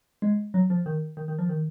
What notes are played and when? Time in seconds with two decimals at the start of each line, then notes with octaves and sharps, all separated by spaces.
0.22 G#3
0.54 F#3
0.70 F3
0.86 D#3
1.17 D#3
1.28 D#3
1.39 F3
1.49 D#3